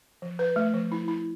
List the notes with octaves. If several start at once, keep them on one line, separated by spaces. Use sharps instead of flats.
F3
B4
A3
F3
E4
E4